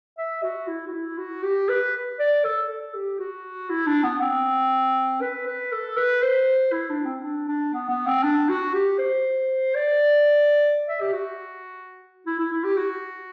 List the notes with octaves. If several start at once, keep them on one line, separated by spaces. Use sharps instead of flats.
E5
F#4
E4
F#4
E4
F#4
G4
B4
D5
A4
A4
G4
F#4
E4
D4
B3
C4
B4
B4
A4
B4
C5
E4
D4
C4
D4
D4
B3
B3
C4
D4
F#4
G4
C5
D5
E5
G4
F#4
E4
E4
E4
G4
F#4